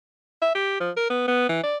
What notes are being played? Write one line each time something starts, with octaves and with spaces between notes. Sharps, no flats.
E5
G4
F3
A#4
B3
B3
E3
D5